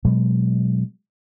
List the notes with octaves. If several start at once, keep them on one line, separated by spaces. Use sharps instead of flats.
B2 F#3 G#3